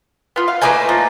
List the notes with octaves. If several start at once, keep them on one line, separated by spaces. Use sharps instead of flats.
B3 F4
F5
A3 A#3 D#4 B4 D5 G#5
F3